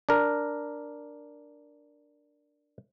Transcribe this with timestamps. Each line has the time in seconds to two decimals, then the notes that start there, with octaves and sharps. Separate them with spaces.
0.09 D4 A#4